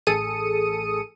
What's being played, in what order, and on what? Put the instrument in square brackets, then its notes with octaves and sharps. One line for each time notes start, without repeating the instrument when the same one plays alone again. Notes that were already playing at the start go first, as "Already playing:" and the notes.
[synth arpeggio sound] A1 G#4 A4 D#6 C#7 D#7